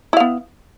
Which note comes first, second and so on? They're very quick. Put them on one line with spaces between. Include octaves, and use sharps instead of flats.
E4 F5 B3